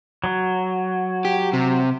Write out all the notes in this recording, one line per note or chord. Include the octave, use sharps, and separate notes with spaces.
F#3
G4
C3